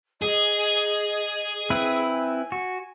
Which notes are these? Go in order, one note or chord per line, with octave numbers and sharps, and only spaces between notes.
G#4 D#5
C4 E4 B4
G#5
F#4